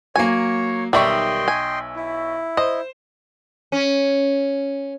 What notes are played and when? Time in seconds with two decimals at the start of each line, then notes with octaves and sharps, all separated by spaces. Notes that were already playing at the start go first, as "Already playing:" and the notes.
0.16 F#3 A#3 C#5 G#5
0.93 B1 D#3 G3 D#5 E5 G5 C6 C#6
1.48 G#5
1.96 E4
2.57 C5 D#5
3.72 C#4